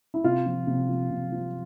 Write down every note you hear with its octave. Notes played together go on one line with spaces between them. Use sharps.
E4
C3 F4
F3
C3
F3
C3
F3